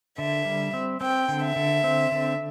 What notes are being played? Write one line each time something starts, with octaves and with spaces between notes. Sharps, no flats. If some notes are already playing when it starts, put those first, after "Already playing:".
D3 E5
G3
C4
C4 G5
D3
E5
D3
C4
D3